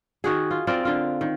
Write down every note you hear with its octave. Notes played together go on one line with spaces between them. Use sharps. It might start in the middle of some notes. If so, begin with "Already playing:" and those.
D#3 F#4 G#4
F4
C4 F4 A#4 D5
D3 F4
D#3